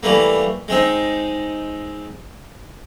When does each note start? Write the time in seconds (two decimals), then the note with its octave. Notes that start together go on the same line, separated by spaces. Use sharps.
0.03 E3 G3 A3 A#3
0.68 G#3 C4 D#4